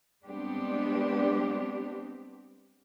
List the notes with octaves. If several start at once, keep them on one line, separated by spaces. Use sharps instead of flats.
G3 G#3 B3 C4 D4 G4